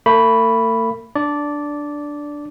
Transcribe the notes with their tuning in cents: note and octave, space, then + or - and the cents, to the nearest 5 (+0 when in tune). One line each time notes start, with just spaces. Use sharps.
A3 +45 B5 +0
D4 +0 D5 -10